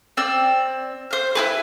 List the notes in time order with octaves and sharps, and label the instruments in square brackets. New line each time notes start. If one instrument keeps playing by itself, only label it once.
[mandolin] C4 D5 E6
C5 F6
E4 G#4 B4